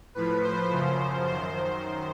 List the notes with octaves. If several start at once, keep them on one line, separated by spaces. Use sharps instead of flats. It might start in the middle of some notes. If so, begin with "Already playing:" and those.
A2 F3 B4
C5
F#2 C#3 F3
F#2 D#3 C5